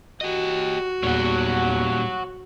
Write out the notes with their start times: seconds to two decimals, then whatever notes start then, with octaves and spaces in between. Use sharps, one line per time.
0.21 F#4 G4 D#5
1.03 E2 A#2 G3 C#5 F#5